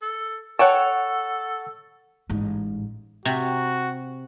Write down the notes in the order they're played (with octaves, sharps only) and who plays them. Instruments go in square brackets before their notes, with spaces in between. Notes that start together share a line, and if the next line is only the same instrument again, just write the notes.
[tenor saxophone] A4
[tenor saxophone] A4 [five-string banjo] C#5 G5 A5 [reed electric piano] F#5 C#6
[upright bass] A1 G#2
[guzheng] C3 [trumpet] F#4